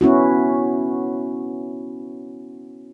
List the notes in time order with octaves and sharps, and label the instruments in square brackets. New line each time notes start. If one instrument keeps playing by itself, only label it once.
[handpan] B3 C#4 E4 F#4